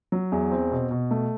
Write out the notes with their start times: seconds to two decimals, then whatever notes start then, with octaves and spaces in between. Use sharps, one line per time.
0.12 F#3
0.32 E2
0.52 C4
0.71 B2
0.91 B2
1.11 A3